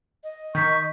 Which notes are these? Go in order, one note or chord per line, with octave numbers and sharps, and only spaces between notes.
D#5
D#3 C#6 G6 B6